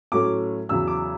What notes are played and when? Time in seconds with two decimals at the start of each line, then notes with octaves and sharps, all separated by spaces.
0.12 A2 F#3 A3 C#4 D6
0.69 E2 C#3 F#3 E6
0.88 D6